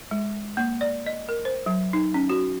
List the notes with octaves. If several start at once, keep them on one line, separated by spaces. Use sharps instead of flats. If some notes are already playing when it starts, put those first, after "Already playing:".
G#3
A#3
D5
D#5
A#4
C5
F#3
D#4
C#4
F#4